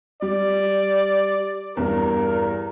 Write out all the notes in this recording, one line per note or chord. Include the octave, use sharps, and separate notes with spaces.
G3 D5
E2 G2 A#4